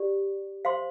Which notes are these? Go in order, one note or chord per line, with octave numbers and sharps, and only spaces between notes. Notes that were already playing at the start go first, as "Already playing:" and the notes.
Already playing: G4 D5
C5 F5 C6